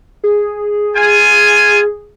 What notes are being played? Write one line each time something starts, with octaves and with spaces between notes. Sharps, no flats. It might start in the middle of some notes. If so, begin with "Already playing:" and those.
G#4
F4 G#5